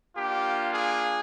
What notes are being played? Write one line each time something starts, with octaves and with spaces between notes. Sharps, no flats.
A#3 D4 F4 G4
G#4